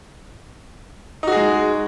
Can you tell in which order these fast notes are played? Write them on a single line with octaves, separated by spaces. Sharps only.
D#4 F#4 G#4 G#3